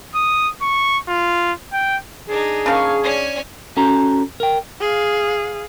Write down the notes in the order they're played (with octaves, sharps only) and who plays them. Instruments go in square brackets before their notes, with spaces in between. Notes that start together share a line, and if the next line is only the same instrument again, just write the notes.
[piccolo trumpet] D#6
C#6
F4
G5
[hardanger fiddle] D4 D#4 [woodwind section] G#4
[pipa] C#3 F3 A#3 [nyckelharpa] F5 C#6
[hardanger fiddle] C#4 G#5 [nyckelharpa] D5
[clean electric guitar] C#4 F#4 A4 A#5
A#4 G5
[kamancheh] G#4 F5